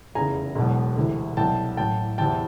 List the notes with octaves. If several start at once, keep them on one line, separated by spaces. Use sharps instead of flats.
F1 E2 C#3 G#5 A#5
E1 E2 B2 F#3
D2 C3 E3
C2 B2 F#3 G5 A5
A1 A2 F#3 G5 A5
E2 C3 E3 G5 A5